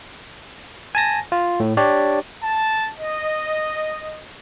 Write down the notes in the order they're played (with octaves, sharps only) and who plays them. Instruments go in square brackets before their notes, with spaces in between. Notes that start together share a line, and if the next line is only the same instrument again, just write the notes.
[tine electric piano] G#5 A5 A#6
F4
A2
D4 G4 C#5 D5
[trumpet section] A5
D#5